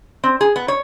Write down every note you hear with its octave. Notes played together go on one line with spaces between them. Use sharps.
C4
G#4
B3
C#5